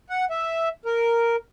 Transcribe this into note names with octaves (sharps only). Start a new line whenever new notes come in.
F#5
E5
A#4